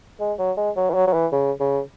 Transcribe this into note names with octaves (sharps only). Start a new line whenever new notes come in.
G#3
F#3
G#3
F#3
E3
F#3
F#3
E3
C#3
C#3